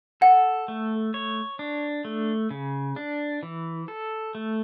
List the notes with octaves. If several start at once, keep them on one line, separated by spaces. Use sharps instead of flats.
A4 F#5
A3
C#5
D4
A3
C#3
D4
E3
A4
A3